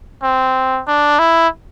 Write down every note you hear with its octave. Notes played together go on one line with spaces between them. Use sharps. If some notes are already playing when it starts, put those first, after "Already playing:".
C4
D4
E4